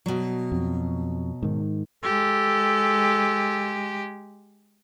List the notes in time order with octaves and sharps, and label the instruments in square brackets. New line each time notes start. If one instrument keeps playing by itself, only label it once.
[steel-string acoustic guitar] B2 F#3
[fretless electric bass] F2
G#2 D#3
[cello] G#3 G4 [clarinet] A4